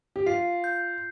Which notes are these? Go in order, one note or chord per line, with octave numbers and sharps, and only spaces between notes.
G4
F4 C7
G6